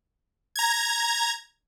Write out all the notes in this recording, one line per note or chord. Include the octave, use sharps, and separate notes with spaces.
A#5 G#6